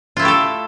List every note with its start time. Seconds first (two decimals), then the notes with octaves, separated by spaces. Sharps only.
0.17 F4
0.19 E4
0.22 A3
0.25 G4
0.28 A4